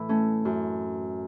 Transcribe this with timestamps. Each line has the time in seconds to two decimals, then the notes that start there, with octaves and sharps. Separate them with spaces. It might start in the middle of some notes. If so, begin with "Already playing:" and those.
Already playing: A2 E3 E4
0.09 A3 C#4
0.45 F#2 E3